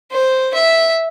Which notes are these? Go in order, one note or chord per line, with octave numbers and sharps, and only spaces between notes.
C5
E5